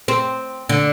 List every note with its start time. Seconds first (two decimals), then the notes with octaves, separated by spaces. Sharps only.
0.08 C4
0.69 D3